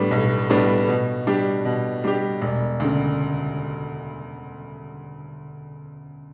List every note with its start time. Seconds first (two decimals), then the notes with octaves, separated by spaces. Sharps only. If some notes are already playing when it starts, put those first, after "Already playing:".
Already playing: A2 G3 B3 D4
0.11 B1
0.50 A2 G3 B3 D4
0.88 B2
1.27 G3 D4 G4
1.65 B2
2.04 G3 D4 G4
2.42 E1
2.80 D2 C#3